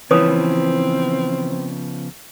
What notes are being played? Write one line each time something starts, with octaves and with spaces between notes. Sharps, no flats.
C#3 E3 F3 B3 C4 B4 C#5 D#6